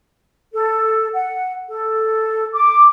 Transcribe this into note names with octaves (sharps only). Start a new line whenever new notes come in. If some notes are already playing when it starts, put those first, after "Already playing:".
A4
F#5
A4
D6